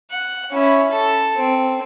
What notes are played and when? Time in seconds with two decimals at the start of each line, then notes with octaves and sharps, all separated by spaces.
0.11 F#5
0.51 C#4 E4
0.91 A4
1.36 C4